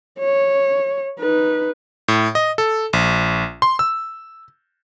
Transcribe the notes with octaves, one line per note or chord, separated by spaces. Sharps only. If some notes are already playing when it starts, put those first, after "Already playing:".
C#5
D#4 B4
A2
D#5
A4
A#1
C6
E6